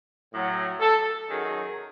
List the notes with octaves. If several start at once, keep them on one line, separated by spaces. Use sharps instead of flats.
A2 F#3
A4
F#2 D#3 F#3 G#4